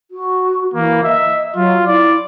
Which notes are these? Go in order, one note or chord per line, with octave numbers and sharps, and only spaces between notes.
F#4
E3 A#3
D#5 E5
F#3 F4
E4 D5